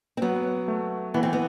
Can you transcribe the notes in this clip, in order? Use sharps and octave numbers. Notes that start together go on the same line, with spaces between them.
C4
F#3 B3
A3
E3 B3
C4
B3